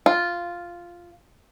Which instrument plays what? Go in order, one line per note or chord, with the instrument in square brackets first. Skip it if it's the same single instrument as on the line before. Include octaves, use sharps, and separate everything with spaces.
[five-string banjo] F4